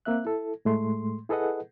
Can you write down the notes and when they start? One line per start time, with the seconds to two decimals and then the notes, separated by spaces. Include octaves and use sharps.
0.05 A#3 C4 E5 F#6
0.25 E4 A4
0.65 A2 G#3 A3 C6
1.29 E4 G#4 A4 B4 D#5 F#5